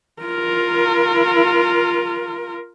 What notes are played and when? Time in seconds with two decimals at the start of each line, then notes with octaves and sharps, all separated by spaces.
0.22 F4 A#4